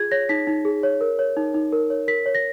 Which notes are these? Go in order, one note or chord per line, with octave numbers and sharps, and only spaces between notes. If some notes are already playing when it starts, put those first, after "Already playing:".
Already playing: F4 G#4 G#6
C#5 A#6
D#4 B6
D#4
G#4
C#5
A#4
C#5
D#4
D#4
A#4
C#5
A#4 B6
C#5
A#6